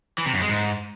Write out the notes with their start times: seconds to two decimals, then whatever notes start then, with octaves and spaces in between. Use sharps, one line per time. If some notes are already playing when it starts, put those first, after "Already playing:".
0.18 E3
0.26 C3
0.34 F#2
0.42 G#3
0.49 G#2